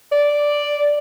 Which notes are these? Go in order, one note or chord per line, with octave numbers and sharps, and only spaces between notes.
D5